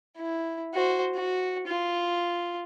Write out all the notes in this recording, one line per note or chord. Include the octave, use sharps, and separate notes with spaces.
E4
F#4 C5
F#4
F4